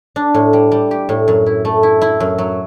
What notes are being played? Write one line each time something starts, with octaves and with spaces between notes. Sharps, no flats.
D4
A2
G3
G3
G4
A2
F#2
E4
A3
E4
E4
F#2
F#3